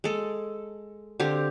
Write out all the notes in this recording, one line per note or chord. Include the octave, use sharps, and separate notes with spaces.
G#3 A4
D3 C4 G4 F5